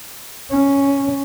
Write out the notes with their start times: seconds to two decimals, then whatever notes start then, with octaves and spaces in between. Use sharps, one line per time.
0.51 C#4